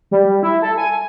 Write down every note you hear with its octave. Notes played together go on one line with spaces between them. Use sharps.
G3
E4
A4
G#5